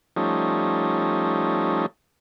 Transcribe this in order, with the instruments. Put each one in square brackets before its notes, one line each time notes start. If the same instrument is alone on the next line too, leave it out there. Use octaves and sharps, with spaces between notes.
[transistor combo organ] F3 G3 A3 C#4 D#4